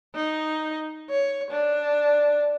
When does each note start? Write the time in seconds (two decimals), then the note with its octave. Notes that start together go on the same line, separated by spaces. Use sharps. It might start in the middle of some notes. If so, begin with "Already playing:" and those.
0.15 D#4
1.10 C#5
1.51 D4